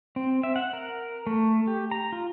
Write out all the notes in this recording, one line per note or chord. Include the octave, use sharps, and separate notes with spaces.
C4
E5
F#5
A#4
A3
G4
A#5
F4